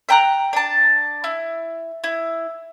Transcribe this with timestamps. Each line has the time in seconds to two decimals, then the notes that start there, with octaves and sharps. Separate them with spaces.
0.09 E5 G5 A#5 F#6
0.53 D4 A5
1.24 E4
2.04 E4